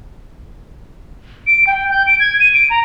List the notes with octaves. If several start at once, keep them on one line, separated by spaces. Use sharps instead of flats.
D7
G5
G6
D7
G#6
D#7
D7
A#5